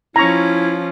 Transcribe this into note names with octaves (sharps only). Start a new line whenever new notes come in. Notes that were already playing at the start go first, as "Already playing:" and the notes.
F3 C#4 E4 A#5 C#6